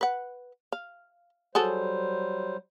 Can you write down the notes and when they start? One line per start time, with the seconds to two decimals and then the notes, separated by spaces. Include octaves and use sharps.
0.01 B4 F#5
0.72 F5
1.55 F#3 G3 F#4 G#4 A4 C5